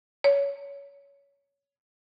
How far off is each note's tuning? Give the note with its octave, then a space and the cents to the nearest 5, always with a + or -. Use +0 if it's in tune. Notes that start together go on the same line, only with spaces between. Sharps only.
C#5 +20